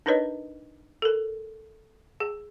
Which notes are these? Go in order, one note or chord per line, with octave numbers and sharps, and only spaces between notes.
D4 D#4 A#4 B4 C#5 D#5
A4 A#4
G#4